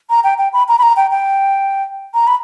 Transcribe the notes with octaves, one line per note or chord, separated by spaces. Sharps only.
A#5
G5
G5
B5
A#5
B5
A#5
G5
G5
A#5
B5